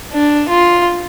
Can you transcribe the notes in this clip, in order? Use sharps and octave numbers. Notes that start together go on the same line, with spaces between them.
D4
F4